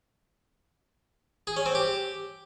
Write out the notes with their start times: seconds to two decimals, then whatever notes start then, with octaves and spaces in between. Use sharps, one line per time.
1.47 G#4
1.57 C#4
1.66 C4
1.75 G4